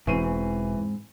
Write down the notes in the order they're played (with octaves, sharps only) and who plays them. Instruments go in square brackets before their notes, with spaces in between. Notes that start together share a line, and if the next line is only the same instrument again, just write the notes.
[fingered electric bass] E1 [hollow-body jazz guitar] G#2 C4 [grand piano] E3 C#6 D#7